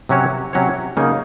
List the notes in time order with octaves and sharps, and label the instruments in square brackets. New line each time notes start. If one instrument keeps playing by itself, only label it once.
[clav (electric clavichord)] C3 F#3 C#4 F#4 C#5
C3 F#3 C#4 F#4 C#5
C#3 F#3 A#3 D#4 A#4